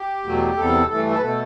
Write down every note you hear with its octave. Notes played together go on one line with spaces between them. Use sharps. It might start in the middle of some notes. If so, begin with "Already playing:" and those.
Already playing: G4
E2 B2 F#3 A3
E2 C3 G3 A4
G2 E3 A3 A4
A4
B4
B2 A3 A4